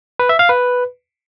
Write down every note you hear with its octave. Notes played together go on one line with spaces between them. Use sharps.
B4
E5
F5
B4